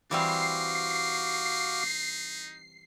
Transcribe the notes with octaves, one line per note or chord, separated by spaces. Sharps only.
E3 G3 C4 D#4 F#4 F5 D6 C7